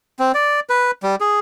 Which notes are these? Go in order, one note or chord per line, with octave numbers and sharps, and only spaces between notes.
C4
D5
B4
G3
G#4